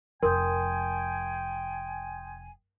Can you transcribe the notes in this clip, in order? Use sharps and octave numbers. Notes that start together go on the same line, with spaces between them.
F1 A#4 G5 G#5 C6 D#6 G6